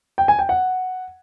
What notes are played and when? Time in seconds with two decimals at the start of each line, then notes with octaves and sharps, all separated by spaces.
0.18 G5
0.28 G#5
0.39 G5
0.49 F#5